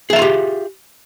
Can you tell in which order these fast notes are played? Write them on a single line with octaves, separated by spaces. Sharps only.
G#4 E5 F5 F4 G4